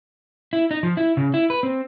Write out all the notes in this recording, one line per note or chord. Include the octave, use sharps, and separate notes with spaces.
E4
D#4
F3
E4
C#3
E4
B4
C4